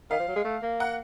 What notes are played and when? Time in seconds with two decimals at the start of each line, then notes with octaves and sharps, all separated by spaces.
0.11 D#3 F5
0.20 F3
0.28 F#3
0.36 G#3
0.45 A3
0.62 A#3
0.80 F#5